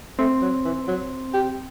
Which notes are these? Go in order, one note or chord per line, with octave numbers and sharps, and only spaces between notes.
A3 C4
F#3
E3
F#3
G4